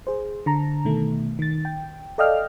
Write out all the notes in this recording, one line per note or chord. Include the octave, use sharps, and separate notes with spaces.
G#4 C5
D3 A5 A#5
B2 D#3 A3
D#3 A6
G5
A4 D5 D#5 F5 G5 F6